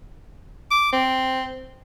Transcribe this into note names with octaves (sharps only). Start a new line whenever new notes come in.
D6
C4